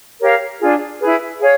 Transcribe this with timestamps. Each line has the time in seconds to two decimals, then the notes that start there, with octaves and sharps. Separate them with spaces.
0.20 G4 A#4 C#5 F5
0.60 D4 F4 G#4
1.00 E4 G#4 B4
1.40 G#4 C#5 F5